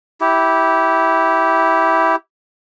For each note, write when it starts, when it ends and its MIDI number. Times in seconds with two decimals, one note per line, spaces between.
0.21 2.16 64
0.21 2.16 67